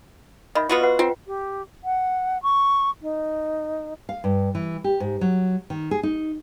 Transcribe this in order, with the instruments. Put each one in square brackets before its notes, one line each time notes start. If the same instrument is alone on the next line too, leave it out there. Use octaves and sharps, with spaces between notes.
[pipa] D#3 [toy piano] D#5 E5 B5
[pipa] B3 F4 F#4
[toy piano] B4 C5 F#5
[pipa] C4 [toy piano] F4 G5
[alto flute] G4
F#5
C#6
D#4
[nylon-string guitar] F5
G2
E3
G4
G#2
F#3
D#3
G#4
D#4